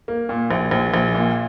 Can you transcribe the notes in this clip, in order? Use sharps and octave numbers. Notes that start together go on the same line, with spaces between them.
A#3
A#2
A#1
A#1
A#1
A#2